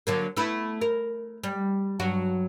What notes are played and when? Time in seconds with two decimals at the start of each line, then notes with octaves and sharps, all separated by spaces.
0.07 D3 F#3 A#3
0.37 A3 B3 E4
0.81 A#4
1.43 G3
2.00 G2 F#3 F#4